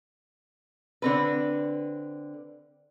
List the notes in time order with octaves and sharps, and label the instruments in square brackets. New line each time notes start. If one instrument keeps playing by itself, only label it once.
[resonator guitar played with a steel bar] D3 C4 B4